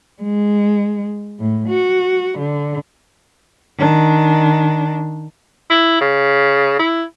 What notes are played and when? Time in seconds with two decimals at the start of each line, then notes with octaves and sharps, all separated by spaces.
0.22 G#3
1.40 A2
1.69 F#4
2.39 D3
3.78 D#3 D4
5.70 E4
6.01 C#3
6.79 E4